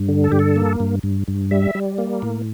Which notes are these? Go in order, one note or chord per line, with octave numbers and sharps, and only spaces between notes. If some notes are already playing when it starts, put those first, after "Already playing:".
Already playing: G2
D3
A4
G2 G4
A4
A#3
G2
G2
G2
G3 E5
G3
A#3
A2